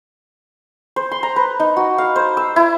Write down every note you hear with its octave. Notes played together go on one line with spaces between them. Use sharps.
C5
C6
A#5
B4
D#4
F#4
F5
C5
E6
E4